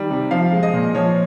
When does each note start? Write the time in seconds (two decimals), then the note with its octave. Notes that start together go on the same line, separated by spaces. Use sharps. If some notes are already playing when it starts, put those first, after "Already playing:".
Already playing: D#3 G3
0.10 C3
0.31 F3 F5
0.52 G#3
0.63 D#5
0.74 A#2
0.95 F3 C#5